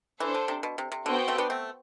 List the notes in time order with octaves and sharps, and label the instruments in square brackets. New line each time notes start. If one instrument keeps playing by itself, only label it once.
[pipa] E3 [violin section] D4 A4 C5
[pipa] D3
C3
B2
C3
C3
[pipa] D3 [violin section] B3 F#4 C5 G5
[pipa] A3 C4
B3 D4
A3 C4